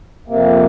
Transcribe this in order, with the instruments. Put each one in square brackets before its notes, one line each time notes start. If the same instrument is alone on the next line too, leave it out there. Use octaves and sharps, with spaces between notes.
[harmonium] F2 C3 A#3